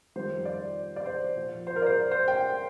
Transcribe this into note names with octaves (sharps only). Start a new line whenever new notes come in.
F2 D#3 G3 C5
D5
D5
C5
A#2 F3
C5
A#4
D5
C5
C5
G5